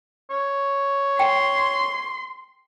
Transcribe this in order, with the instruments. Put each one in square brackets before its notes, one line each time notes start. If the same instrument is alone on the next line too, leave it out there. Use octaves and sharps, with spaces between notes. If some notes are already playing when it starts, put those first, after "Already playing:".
[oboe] C#5
[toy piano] G5 [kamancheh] C6